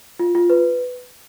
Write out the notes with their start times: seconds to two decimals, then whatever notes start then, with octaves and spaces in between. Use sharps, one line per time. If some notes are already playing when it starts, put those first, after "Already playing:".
0.19 F4
0.35 F4
0.50 B4